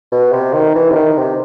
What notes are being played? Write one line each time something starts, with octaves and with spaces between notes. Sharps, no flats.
B2
C3
D#3
E3
C3
D#3
C3